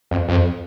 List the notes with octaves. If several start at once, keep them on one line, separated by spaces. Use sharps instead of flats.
F2
F2